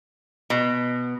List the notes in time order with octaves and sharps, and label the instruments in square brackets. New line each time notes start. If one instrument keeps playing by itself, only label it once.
[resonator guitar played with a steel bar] B2